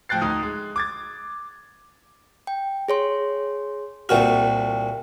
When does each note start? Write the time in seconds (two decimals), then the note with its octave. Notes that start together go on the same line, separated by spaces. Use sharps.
0.09 A2 F3 G5 F#6 A6 C7
0.22 D2 D#4 D#6
0.43 G#3
0.76 D6 G#6 A6
2.47 G5
2.88 G#4 C#5 C6
4.09 C2 A#2 F#4 E5 G5 F6